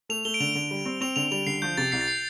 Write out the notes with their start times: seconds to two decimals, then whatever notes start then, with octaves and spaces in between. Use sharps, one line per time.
0.09 A3 F7
0.25 A3 G7
0.34 D7
0.40 D3 F7
0.55 D3
0.71 G3
0.85 C4
1.01 C4 F7
1.16 D3 F7
1.31 G3 F7
1.46 D3 C7
1.62 F3 G6
1.77 C3 A6
1.92 C2 C7
2.01 A6
2.08 C7